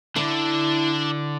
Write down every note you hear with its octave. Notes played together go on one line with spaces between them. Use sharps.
D3 D4 E4 D5